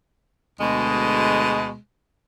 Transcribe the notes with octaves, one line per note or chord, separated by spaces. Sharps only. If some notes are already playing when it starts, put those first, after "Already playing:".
D2 B2 G#3